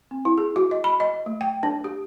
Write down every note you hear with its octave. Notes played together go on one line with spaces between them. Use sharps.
C4
E4
G#4
F#4
D#5
B5
D#5
A3
G5
D4
G4